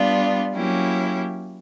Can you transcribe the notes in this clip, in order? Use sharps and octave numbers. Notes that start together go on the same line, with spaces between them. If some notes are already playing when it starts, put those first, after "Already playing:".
Already playing: G3 B3 D4 F4
F#3 A#3 C#4 E4 G4